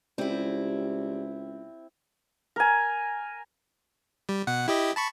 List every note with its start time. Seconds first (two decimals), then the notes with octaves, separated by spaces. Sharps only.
0.18 C#2 G3 C4 E4
2.56 A#4 G#5
4.29 G3
4.47 B2 F#5
4.68 E4 G4 D#5
4.96 A5 B5 C#6